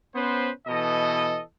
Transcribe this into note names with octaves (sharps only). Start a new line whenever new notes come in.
B3 C#4 B4 C5
B2 E3 A4 D#5